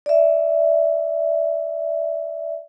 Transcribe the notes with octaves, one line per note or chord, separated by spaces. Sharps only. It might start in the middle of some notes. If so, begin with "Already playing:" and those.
D5 E5